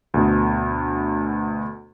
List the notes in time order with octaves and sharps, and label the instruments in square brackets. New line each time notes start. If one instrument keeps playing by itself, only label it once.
[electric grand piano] D2 B2